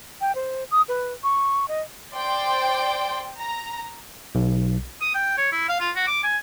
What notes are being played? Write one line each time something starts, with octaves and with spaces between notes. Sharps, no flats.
G5
C5
D#6
B4
C#6
D#5
C5 D5 G5 C6
A#5
B1
D#6
G5
C#5
E4
F5
F4
F#4
D6
G#5